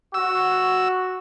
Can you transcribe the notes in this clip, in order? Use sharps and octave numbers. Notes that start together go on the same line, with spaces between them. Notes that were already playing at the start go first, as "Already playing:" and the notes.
F#4 E6